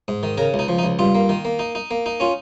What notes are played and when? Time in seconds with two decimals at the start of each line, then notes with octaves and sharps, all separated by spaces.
0.08 G#2
0.23 D#3
0.37 C#3 A#4
0.54 C#2
0.59 D#4
0.68 F3
0.79 D#4
0.83 C#2
0.99 G2 F4
1.15 A#3
1.29 D#3
1.45 A#3
1.59 D#4
1.75 D#4
1.91 A#3
2.06 D#4
2.20 C#4 F4